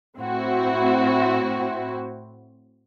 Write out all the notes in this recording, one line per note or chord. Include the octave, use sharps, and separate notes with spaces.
A2 C4 E4 F#4